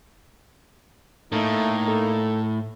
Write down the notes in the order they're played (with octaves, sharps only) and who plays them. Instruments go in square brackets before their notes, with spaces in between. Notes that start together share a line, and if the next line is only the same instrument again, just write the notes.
[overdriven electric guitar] A2 [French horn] A3 [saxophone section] A#3 D#4
[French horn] A4